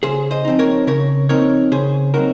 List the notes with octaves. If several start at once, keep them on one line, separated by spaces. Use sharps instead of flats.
C#3 G#4 C5
C5 D#5
F3 C4 D#4
A#4 C#5
C#3 A#4 C#5
F3 C4 D#4 A#4 C#5
C#3 G#4 C5
F#3 C4 D#4 F#4 A#4